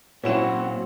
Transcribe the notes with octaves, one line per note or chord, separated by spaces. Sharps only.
A#2 F#3 C4 C#4 E4 F#5 E7